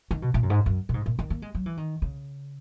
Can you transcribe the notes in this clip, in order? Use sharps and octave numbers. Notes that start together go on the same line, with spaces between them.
D#3
B2
A#2
F#2
G#2
F#2
A#2
G#2
A#2
D#3
A#3
G#3
F#3
E3
D#3
C#3